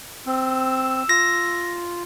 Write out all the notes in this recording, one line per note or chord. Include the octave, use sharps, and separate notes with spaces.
C4 E6
F4 A#6